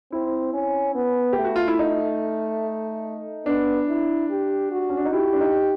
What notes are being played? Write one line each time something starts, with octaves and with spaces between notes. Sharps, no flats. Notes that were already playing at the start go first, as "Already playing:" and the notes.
C4 E4
C#4
B3
A3 G4
F#4
F4
E4
D#4
B3 D4
E4
G4
F#4
C#4
D4
D#4
E4 G4
D4
D#4